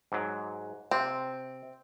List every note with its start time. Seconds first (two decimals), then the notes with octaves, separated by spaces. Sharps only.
0.12 G#2 F#3
0.91 C3 C4